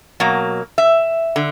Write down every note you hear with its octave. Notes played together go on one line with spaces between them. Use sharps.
B2 F#3 A#3
E5
D3